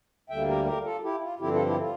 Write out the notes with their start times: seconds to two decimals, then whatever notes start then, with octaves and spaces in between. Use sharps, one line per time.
0.30 D2 D3 G3 A#3 E5 G5
0.48 G4 A#4
0.66 G4 A#4
0.84 F4 A4
1.03 E4 G4
1.22 F4
1.39 G2 D3 F3 C4 E4 G4
1.53 F4 A4
1.67 E4 G4
1.81 F4